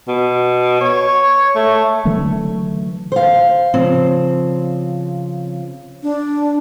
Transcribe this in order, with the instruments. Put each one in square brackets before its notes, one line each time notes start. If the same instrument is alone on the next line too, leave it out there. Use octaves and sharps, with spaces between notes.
[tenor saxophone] B2
C#5
A3
[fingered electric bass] D3 E3 F#3 A3
[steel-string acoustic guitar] C5 F5
C#3 F3 C4
[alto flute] D4